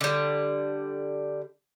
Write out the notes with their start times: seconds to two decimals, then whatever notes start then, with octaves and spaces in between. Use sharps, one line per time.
0.01 D3 G3